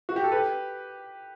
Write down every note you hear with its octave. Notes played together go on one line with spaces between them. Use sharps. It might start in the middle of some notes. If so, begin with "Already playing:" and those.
F#4
G4
A4
G4 B4